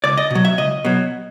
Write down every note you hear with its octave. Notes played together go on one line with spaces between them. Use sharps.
C#2 D5
D#5
B2 F#3
E5
C#2 D#5
B2 F#3